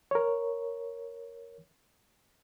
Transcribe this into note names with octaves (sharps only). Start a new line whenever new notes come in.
A#4 C#5